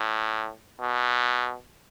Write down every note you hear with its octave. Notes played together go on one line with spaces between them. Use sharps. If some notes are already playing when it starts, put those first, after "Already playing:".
Already playing: A2
B2